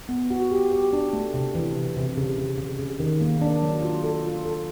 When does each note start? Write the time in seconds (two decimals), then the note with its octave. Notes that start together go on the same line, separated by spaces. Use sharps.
0.09 B3
0.30 F#4
0.52 G4
0.71 G4
0.93 D4
1.13 A3
1.34 C3
1.55 E3
1.76 C3
1.97 C3
2.17 C#3
2.38 C#3
2.58 C#3
2.79 C#3
3.00 D#3
3.21 A#3
3.42 D4
3.62 F#3
3.82 F4
4.03 A4
4.25 F4
4.45 A4